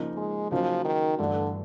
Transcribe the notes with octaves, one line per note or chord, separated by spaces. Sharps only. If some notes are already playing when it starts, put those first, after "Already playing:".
Already playing: C#3 F3 A#3 D#4
G#3
C#3 F3 F#3 A#3 D#4
D#3
G2 D3 E3 A3 D4